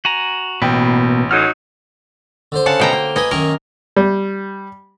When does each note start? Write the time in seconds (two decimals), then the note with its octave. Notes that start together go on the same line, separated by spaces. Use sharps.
0.05 F#4 G#5 A#5
0.62 A1 B2 A#3 B4 G5
1.31 F#3 D#4 G#4 A4 F6
2.52 D3 C5
2.66 C#3 F#5 A5
2.80 B2 G5 A#5
2.93 A#3
3.16 B4 D#5 G#5
3.31 F#2 D#3 A#4 C#6
3.96 G3